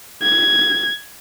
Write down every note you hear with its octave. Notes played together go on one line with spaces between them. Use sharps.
G#6